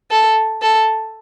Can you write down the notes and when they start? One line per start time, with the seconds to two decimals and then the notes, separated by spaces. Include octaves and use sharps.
0.11 A4
0.62 A4